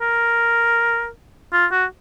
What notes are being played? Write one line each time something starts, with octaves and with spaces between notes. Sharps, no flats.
A#4
F4
F#4